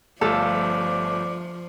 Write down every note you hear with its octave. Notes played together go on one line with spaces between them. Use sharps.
G1 F3 A3 F4 A4 D5